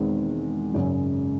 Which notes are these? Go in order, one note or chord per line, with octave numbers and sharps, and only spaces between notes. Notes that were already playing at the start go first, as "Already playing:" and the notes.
Already playing: E1 E2 D#3 G#3 C4
G#1 F#2 C#3 G#3 C#4